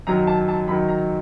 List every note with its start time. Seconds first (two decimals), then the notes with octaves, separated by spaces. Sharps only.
0.07 F#2 D#3 F#3 A#5
0.27 A5
0.48 A5
0.68 F#2 D#3 F#3 B5
0.88 A#5